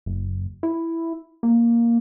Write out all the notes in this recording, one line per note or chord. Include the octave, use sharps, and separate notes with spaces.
F#1
E4
A#3